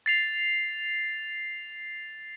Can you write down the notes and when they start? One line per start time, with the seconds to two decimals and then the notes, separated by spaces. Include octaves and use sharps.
0.06 A6 C7 F7